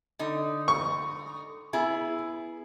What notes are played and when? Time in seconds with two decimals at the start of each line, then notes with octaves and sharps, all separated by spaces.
0.19 D3 D#4
0.68 C#6
1.73 B3 E4 G#4